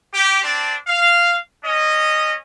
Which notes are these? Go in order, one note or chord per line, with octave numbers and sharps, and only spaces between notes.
G4
C4 D4
F5
C#4 D#5